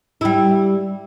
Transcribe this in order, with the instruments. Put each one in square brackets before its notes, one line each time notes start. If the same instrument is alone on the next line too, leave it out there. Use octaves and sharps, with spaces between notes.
[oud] G3 E4